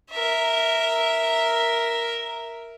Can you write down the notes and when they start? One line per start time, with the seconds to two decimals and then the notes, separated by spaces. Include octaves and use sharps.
0.11 A#4 E5